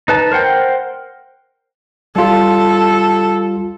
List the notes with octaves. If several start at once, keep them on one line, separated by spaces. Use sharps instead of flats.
D#4 B4 A5
A#4 C5 F#5 G5
G3 F4 A4